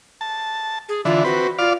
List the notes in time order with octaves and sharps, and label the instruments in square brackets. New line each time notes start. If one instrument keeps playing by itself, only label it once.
[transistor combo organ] A5
[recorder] G#4
[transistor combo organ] D3 E3 [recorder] F4
[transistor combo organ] C4 B4 [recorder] F#4
[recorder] F4 [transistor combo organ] D5 F5